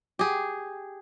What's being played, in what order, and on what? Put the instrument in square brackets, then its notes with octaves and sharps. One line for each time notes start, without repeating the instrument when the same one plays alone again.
[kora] G4 G#4